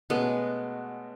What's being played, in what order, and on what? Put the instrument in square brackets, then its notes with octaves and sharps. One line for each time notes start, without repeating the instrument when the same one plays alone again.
[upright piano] B2 A3 C#4 F#4 [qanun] G#3 B3